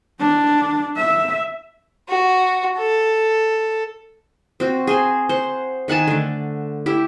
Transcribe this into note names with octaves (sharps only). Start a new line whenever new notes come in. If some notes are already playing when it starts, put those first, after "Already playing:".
D4
E5
F#4
A4
C4 F#4
G#4 C5 G#5
C5 F#5
D#3 F#5 G#5 A5
D3 A3
E4 G4